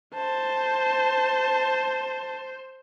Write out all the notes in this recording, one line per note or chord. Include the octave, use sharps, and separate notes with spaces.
C5 A5